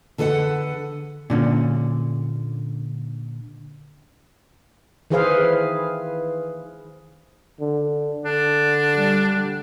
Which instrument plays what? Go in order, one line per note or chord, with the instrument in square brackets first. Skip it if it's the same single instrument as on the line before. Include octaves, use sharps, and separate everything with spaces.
[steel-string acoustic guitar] D3 A4 B4 D5 F#5
[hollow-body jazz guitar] A#2 D3 C#4
[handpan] D#3 E3 G#4 B4 C5 F5
[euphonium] D3
[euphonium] D3 [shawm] D4
[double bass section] G3